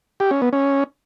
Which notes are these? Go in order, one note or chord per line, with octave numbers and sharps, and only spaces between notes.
G4
C#4
B3
C#4